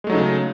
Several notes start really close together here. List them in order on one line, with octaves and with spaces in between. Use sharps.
G#3 A3 F#3 D#4 C#3